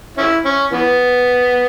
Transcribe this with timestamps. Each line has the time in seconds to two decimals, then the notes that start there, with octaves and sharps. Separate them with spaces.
0.18 C#4 E4
0.45 C#4
0.72 E3 B3